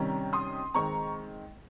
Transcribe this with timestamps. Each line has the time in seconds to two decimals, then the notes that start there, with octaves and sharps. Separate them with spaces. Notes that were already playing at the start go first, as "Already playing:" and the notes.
Already playing: C3 D#3 G3 C#4 A#5
0.33 C6 D#6
0.74 D#3 G#3 C4 A#5 C#6